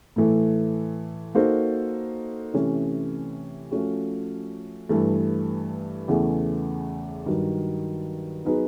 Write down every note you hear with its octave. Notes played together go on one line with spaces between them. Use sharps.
A2 E3 A3
A#3 D#4 F#4 A4 C5
C3 E3 A3 C#4
F3 A3 C#4 F#4
G2 E3 A3
E2 C#3 E3 A3
G2 D#3 F#3
F#3 B3 D#4 G#4 B4